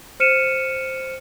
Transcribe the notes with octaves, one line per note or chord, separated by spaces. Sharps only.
C5 F6 C#7 D#7 E7